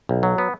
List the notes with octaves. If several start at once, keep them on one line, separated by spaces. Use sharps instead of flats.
B1
F#3
B3